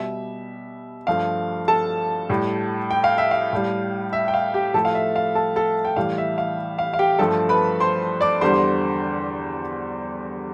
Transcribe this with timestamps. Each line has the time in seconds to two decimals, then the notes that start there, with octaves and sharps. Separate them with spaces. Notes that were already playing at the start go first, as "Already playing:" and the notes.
Already playing: B2 G3 E5
1.07 G2 F3 A3 F5
1.68 A4 A5
2.29 A2 G3
2.91 G5
3.04 F5
3.18 E5
3.31 F5
3.53 A2 G3
4.13 E5
4.28 G5
4.34 F5
4.54 G4 G5
4.74 A2 F3 A3 A4 A5
4.85 F5
4.95 E5
5.16 F5
5.35 A4 A5
5.56 A4 A5
5.85 G5
5.96 A2 E3 G3 F5
6.18 E5
6.38 F5
6.78 F5
6.93 F5
6.99 G4 G5
7.19 G2 F3 A3 A4 A5
7.49 B4 B5
7.80 C5 C6
8.21 D5 D6
8.41 E2 D3 G3 C5 C6